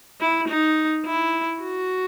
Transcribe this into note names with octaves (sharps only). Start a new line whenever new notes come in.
E4
D#4
E4
F#4